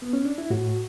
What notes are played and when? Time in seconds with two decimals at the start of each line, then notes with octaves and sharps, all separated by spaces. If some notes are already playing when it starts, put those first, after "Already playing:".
0.02 B3
0.13 C#4
0.25 D4
0.38 E4
0.50 A2 F#4